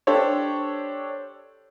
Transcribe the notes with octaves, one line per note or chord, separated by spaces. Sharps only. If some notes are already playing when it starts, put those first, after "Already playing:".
D4 G4 A4 C5 C#5